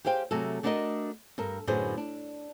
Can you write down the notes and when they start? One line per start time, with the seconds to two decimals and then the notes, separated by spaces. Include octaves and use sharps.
0.05 G4 G#4 C5 F5 G5
0.31 C3 F#3 A3 G#4 A4
0.63 A3 D4 F#4 A#4 B4 D#5
1.38 G2 A4 A#4
1.67 F#2 A2 D3 G#4 B4 C5
1.97 D4